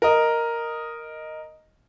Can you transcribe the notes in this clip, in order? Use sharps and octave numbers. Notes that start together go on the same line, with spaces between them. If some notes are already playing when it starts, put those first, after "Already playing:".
A#4 D#5